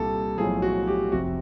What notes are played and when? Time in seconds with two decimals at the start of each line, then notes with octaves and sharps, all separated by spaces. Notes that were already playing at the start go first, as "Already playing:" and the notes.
Already playing: C2 A#2 G3 A4
0.38 B1 A2 F3 G#4
0.62 F#4
0.88 G4
1.12 F1 F2 C3 F#4